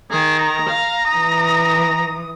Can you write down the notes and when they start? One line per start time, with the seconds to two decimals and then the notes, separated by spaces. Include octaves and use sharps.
0.10 D#3 G#4
0.39 A#5
0.70 F5
1.10 E3 D#6